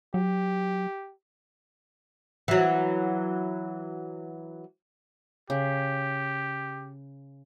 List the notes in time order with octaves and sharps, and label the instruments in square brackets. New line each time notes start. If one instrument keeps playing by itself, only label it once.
[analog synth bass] F#3 [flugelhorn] G4
[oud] E3 F#3
[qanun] C#3 [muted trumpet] G4